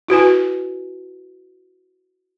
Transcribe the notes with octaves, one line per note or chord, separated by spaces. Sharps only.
E4 F#4 B4 G#5